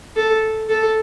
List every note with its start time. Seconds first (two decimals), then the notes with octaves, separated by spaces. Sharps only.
0.16 A4
0.69 A4